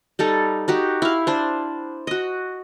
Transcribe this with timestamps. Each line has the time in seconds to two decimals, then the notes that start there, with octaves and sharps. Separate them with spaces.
0.19 G3 D#4 A4
0.68 D#4 F#4 G4
1.02 E4 F5
1.27 D4 C5
2.07 F#4 D#5